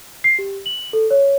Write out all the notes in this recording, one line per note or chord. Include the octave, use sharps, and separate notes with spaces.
C7
G4
F#7
A4
C#5